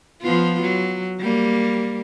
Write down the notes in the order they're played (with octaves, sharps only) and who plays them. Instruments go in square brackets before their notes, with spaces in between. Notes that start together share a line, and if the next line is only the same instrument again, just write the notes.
[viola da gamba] F3 B3 F4
F#3
G3 A#3